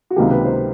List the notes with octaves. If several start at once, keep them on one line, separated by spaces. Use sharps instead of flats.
F#4
C#2 C3 D#3 F#3 A#3 G4
B4
C5